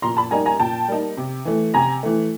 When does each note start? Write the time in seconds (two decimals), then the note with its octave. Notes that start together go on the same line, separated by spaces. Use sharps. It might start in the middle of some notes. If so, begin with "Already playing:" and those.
0.02 A#2 A#5 C6
0.17 A5 B5
0.31 G3 A#3 D#4 G#5 A#5
0.46 G#5 A#5
0.60 A#2 G5 A5
0.88 G3 A#3 D#4
1.17 C3
1.45 E3 A3
1.74 C3 G#5 A#5
2.03 E3 A3